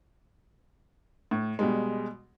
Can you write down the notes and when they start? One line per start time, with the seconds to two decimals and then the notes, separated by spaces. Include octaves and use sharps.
1.31 A2
1.59 B2 G3 G#3